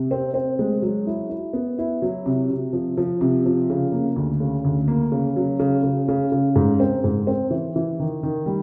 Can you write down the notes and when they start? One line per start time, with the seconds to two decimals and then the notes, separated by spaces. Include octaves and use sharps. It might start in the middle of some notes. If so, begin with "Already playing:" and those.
Already playing: C3
0.11 C4
0.34 C4
0.59 G#3
0.82 F#3
1.07 E4
1.30 E4
1.53 B3
1.78 E4
2.02 F#3
2.26 C3
2.50 C3
2.73 F3
2.97 F3
3.21 C3
3.46 F3
3.70 C#3
3.92 A#3
4.16 D2
4.40 C#3
4.65 D2
4.88 A#3
5.12 C#3
5.36 F#3
5.59 C#3
5.83 C#3
6.08 C#3
6.32 C#3
6.56 G#2
6.80 C4
7.04 G#2
7.27 C4
7.51 E3
7.76 E3
8.00 D#3
8.23 D#3
8.46 G3